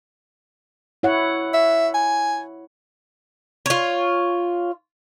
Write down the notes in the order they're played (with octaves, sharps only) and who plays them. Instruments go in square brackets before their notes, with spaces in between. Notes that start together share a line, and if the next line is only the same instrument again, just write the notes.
[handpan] E4 C#5 F#5
[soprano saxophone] E5
G#5
[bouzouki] F4 C#5